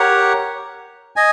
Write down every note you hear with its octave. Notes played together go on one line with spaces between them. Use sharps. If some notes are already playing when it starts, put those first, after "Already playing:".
Already playing: G4 A#4 C#5 F#5
D#5 G#5